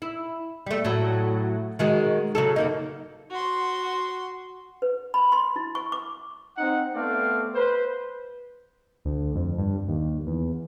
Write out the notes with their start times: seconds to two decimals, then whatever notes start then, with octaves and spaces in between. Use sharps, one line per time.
0.02 E4
0.66 G3 A3
0.85 A2 F#3
1.79 D#3 G#3 F#4
2.35 C#3 F#3 A4
2.56 F#2 A#3 D#4
3.30 F#4 C6
4.82 B4
5.14 B5
5.32 C6
5.56 E4
5.75 C#6
5.92 D6
6.58 C4 D#4 F#5
6.95 A3 B3 C4 D5 F5
7.55 B4 C5
9.05 D2
9.35 F2
9.58 G2
9.88 D#2
10.27 E2